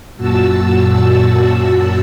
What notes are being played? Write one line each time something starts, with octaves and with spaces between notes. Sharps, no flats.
F#2 A#2 F#4 A5 E6